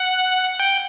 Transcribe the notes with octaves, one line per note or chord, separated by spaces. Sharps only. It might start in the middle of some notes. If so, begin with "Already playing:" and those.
Already playing: F#5
G5